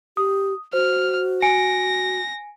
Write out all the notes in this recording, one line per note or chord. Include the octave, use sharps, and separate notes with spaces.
G4 D#6
F#4 C5 F6
G#5 A#6 C#7 D7